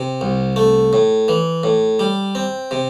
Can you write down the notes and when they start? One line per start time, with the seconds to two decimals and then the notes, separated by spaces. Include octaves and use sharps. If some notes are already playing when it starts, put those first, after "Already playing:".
Already playing: C3
0.21 C2
0.56 A3
0.93 A2
1.28 E3
1.64 A2
1.99 G3
2.35 C4
2.71 C3